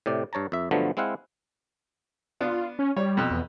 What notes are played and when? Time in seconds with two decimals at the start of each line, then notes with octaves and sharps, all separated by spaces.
0.06 A2 C3 D5
0.33 G2 C#5 A5 A#5
0.52 F2 E5
0.71 G2 D3 F3 F#3 A3 B3
0.97 G#3 C4 E4 F5 F#5
2.41 B3 D4 F4
2.79 C#4
2.96 G3 C#5
3.17 F2 B2
3.31 E2